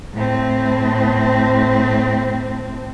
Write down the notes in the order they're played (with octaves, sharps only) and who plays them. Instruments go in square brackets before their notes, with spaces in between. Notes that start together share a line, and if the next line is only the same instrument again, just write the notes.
[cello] A2 C4